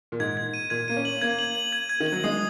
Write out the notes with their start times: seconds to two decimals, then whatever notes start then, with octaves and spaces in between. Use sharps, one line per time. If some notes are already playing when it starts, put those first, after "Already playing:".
0.12 A#2
0.20 G#2 G#6
0.37 G#6
0.54 D#7
0.70 A#2 G#6
0.88 A#3 D#7
0.97 C#4
1.05 F#7
1.22 A#3 G#6
1.39 F#7
1.55 F#7
1.73 G#6
1.89 G#6
2.00 D#3
2.07 F#7
2.12 F#3
2.24 G#3 D#6